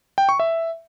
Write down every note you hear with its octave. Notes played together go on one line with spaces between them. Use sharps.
G5
C#6
E5